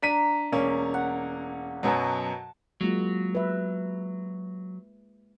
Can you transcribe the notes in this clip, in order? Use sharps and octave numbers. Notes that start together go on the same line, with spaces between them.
D4 A#5 B6 D#7
E1 A#3 C#4
F#5
F#2 B2 F#3 A5
F#3 G#3 A#3 F4
B4 E5